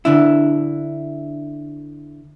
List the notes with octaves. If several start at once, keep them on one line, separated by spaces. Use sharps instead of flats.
D3 D4 E4